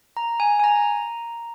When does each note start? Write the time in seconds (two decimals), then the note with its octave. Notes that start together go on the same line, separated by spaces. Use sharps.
0.17 A#5
0.40 G#5
0.60 G#5
0.64 A#5